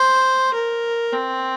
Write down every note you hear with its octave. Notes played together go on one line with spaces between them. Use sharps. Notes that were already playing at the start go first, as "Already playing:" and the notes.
Already playing: C5
A#4
C4